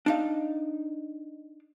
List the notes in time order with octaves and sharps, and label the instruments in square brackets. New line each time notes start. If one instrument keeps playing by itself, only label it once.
[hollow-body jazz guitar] D4 D#4 F5